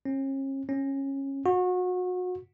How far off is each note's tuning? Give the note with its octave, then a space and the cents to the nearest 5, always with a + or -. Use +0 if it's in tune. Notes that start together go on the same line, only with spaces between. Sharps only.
C#4 -40
C#4 -20
F#4 -30